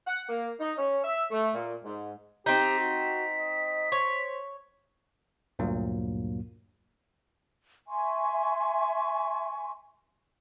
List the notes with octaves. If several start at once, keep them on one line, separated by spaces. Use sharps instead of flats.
F#5
A#3
D#4
C#4
E5
A3
A#2
G#2
C4 D#4 G4 B6
F#4
D#5
C5 C#5
D2 G2 A#2 F#3 A#3
E5 G#5 C6 C#6